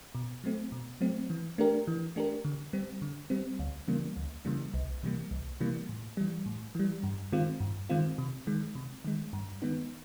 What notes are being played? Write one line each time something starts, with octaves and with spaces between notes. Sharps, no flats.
B2
F#3 A3 C4
B2
F#3 A3 C4
E3
A3 D4 G4 A#4
E3
A3 D4 G4 A#4
D3
G3 C4
D3
G3 C4
D2
C#3 E3 G3 A#3
D2
C#3 E3 G3 A#3
C2
C3 E3 G3 A#3
C2
C3 E3 G3 A#3
A2
E3 G3
A2
E3 G3
G2
D#3 G#3 C4 F4
G2
D#3 G#3 C4 F4
C3
D#3 G#3
C3
D#3 G#3
G2
D#3 G#3 B3 D#4